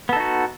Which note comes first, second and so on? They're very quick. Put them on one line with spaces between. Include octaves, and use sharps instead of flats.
B3 A4 D#4 F#4